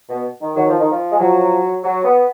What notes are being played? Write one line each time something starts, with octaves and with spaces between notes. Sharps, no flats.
B2
D#3
D#3 F#3
F3
D#3
F3
G#3
F3 F#3
F#3
B3